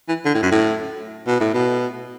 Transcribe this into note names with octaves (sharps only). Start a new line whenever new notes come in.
E3
D3
A2
F#2
A2
B2
A2
B2